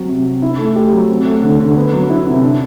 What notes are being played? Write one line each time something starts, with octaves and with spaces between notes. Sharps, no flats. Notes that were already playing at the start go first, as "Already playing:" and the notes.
Already playing: F#3 C4
C3
C3
E4
A3
G4
F#3
C4
A3
D3
D3
B3
F#3
E4
C3
D4